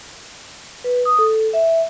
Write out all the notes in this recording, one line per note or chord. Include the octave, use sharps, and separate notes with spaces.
B4
D#6
A4
E5